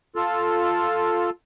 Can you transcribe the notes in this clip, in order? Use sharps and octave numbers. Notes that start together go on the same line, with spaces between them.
F4 A4